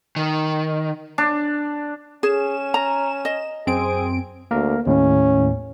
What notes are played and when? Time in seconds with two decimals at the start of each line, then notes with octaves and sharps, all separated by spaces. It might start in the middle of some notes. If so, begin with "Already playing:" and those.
0.16 D#3
1.18 D4
2.23 C#4 G#4 E7
2.74 A#5
3.25 D#5
3.67 F#2 C4 G#4 D7
4.51 D2 A#3 A#4
4.87 D#2 A2 A#3 C#4